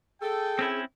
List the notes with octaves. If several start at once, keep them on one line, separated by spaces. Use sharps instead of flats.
G#4 A4 G5
C4 C#4 E4